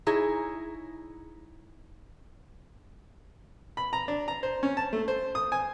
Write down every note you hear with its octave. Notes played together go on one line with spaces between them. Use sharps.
D#4 E4 G#4 C#5
B5
A#5
D4
A#5
C5
C#4
A5
A3
C5
D#6
G#5